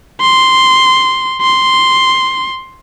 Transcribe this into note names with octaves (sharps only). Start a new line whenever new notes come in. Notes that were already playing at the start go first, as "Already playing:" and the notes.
C6
C6